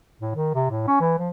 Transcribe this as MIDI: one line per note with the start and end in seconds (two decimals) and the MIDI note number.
0.21 0.32 45
0.35 0.53 51
0.55 0.66 48
0.70 0.86 45
0.87 0.98 61
1.00 1.15 52
1.18 1.30 53